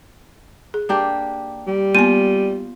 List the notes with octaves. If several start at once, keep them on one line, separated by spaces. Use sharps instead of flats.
G#4
A#3 D4 G4
G3
A#3 B3 F4 G#5 D#7